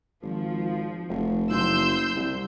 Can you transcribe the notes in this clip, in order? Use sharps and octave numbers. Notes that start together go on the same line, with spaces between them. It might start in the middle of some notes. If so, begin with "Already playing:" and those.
G#1 F3
F1
F#1 C6 E6 G6
C2